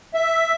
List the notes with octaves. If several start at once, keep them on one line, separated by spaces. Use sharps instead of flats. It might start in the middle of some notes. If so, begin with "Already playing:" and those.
E5